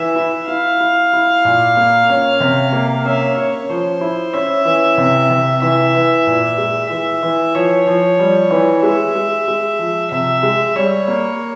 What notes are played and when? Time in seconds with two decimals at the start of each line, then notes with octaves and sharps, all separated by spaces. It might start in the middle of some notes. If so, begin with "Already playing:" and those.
Already playing: E3 E5
0.16 E4
0.48 E4 F5
0.80 E4
1.13 E4
1.45 A#2
1.77 A#3
2.10 C#4
2.40 C3
2.73 A#3
3.06 C#4 E5
3.37 C#4 C#5
3.69 F3 C5
4.01 E4
4.34 C#4 E5
4.65 E3
4.98 C3
5.30 C3
5.62 E3 E5
5.95 E3
6.27 A#2
6.58 G#3
6.90 E3 E5
7.23 E3
7.55 F3 C#5
7.87 F3
8.19 G3
8.51 E3
8.83 G#3 E5
9.16 G#3
9.48 G#3
9.79 F3
10.11 C3 E5
10.43 G#3
10.76 G3 C#5
11.08 A#3